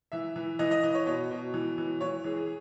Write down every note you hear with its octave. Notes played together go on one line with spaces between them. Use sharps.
E3 E5
E3
E3 D#5
D#5
E3 D#5
C#5
B2 C#5
B2
E3
E3
E3 C#5
E3 G#4
G#4